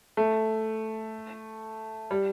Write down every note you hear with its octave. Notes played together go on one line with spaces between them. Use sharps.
A3
G3